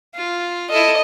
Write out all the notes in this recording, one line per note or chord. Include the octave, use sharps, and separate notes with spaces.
F4
E4 A4 D#5